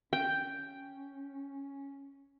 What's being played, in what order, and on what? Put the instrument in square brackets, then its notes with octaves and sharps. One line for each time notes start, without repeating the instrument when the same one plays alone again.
[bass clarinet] C#4 [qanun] G5